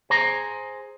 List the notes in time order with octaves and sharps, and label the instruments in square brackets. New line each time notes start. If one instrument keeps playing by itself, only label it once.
[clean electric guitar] G#4 C5 A#5